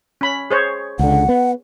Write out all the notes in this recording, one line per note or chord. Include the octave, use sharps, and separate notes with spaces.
C#4 B5
G#4 C5 C#5
C#2 D3 F#5
B3